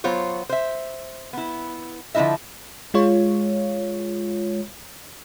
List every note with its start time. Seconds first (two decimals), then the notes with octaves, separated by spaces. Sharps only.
0.04 F#3 B3 F4 C5 C#5
0.49 C5 E5
1.33 B3 E4
2.15 D3 F3 G#3 E4 D#5 E5
2.94 G#3 F4 C#5